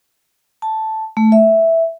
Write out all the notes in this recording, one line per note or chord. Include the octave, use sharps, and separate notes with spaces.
A5
A3
E5